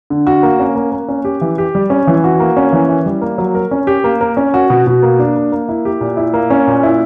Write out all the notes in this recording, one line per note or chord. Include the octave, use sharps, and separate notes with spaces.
D3
F#4
A#3
C#4
A#3
A#3
C#4
G4
E3
G4
G3
C#4
E3
F#4
A#3
C#4
E3
E4
G3
A#3
F#3
A#4
C#4
G4
A#3
A#4
C#4
F#4
B2
B2
A#3
D4
A#3
A#3
E4
G4
A#2
E4
A#3
C#4
A#2
E4